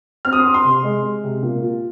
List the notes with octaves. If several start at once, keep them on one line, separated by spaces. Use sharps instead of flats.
C4 F6
D#6
C6
C4 D#6
C6
C3
G#3
G#3
C3
A#2
F4